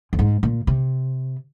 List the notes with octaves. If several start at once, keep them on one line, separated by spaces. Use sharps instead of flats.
F2
G#2
A#2
C3